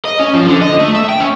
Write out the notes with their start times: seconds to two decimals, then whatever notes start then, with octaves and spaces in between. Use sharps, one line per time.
0.05 D#5
0.20 C#4
0.34 F3
0.46 D3
0.61 D#5
0.79 A3
0.95 E5
1.09 G5
1.20 C#4